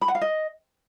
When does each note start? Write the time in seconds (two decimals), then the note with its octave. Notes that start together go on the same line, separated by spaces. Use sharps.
0.01 B5
0.08 F#5
0.15 F5
0.21 D#5